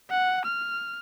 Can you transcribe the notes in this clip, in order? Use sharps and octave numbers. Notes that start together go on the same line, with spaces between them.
F#5
F6